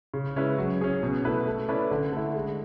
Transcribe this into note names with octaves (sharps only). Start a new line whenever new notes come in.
C#3
G#3 C#4 E4 B4
F#3
C#4 G#4 C#5
B2
A3 E4 B4
A3
C#4 E4 B4 D5
D3
A3 E4
G#3